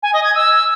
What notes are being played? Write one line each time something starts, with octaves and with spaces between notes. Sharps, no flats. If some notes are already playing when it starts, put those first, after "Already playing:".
G#5
D#5
G#6
E6